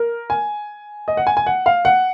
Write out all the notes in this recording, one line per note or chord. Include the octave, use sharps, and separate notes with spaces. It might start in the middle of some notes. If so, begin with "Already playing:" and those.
Already playing: A#4
G#5
D#5
F#5
G#5
G#5
F#5
F5
F#5